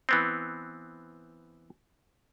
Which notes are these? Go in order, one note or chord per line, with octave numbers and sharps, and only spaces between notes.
E3 B3 C4